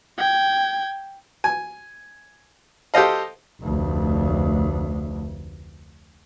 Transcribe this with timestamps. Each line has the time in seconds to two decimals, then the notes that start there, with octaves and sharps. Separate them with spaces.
0.18 G5 G#6
1.44 G#5
2.94 G4 A4 C5 D#5 F5
3.60 F1 D2